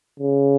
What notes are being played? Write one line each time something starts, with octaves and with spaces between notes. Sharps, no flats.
C#3